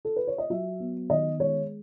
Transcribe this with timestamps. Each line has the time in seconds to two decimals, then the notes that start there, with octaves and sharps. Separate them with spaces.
0.05 A4
0.16 B4
0.27 C#5
0.38 D#5
0.50 F#3 E5
0.80 B3
1.10 D#3 D#5
1.40 G#3 C#5